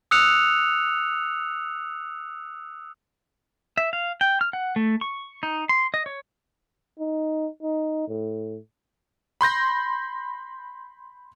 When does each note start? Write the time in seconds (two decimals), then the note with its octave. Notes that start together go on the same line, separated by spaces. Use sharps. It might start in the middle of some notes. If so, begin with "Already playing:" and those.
0.11 D#6 E6 F#6 C#7 F7
3.77 E5
3.93 F5
4.21 G5
4.41 F6
4.53 F#5
4.76 A3
5.01 C#6
5.43 D#4
5.69 C6
5.94 D#5
6.06 C#5
6.99 D#4
7.62 D#4
8.08 A2
9.41 B5 C6 G6 A#6